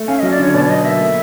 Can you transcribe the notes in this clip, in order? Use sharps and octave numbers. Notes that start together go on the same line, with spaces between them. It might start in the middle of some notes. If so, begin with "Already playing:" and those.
Already playing: A3
C#4 F5
F#3 D#5
D5
D3 C#5
B2 D5
D5
F#3 D#5
A#3 E5
A3